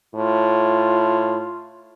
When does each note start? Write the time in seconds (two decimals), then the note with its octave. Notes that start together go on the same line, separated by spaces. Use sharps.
0.15 A2 F4